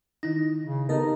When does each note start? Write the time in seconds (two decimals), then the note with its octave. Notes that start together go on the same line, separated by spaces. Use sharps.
0.23 D#3 D#4 E4 A#6
0.64 C#3
0.89 B3 D#4 G4 A4 A#4 D#5